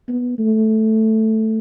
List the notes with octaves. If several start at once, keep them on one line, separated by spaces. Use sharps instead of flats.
B3
A3